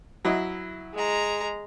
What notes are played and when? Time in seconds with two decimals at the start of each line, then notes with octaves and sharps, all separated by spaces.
0.25 F#3 E4 D#5
0.94 G#3 A#5